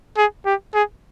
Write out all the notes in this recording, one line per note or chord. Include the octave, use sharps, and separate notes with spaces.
G#4
G4
G#4